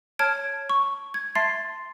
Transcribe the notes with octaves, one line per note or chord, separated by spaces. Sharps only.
C#5 A5 F6 G#6 D7
C#6
G#6
E5 A5 C6 A6 C7